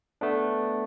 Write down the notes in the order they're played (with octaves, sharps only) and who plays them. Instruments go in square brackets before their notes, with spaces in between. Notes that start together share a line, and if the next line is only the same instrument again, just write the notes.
[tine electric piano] A3 B3 D4